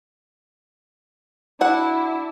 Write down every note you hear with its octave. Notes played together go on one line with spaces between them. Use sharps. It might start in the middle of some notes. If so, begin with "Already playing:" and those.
D4 E4 F#4 F#5